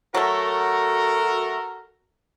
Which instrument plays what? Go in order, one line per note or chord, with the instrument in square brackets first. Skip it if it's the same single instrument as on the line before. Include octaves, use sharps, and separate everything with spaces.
[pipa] F#3 A3 [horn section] F#4 A4 A#4